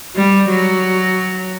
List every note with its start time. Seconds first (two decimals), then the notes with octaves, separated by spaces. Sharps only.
0.16 G3
0.49 F#3